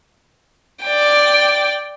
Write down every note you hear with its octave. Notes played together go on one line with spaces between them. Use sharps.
D5 G5